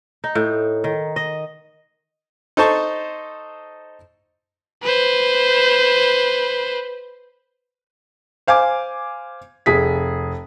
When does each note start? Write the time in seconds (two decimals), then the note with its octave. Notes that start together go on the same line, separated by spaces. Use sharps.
0.24 D#4
0.35 A2
0.84 D#3
1.16 D#5
2.57 D#4 A4 C5 A5 C#6
4.83 B4 C5
8.47 C5 F5 G#5 D6
9.66 F1 G#4 B6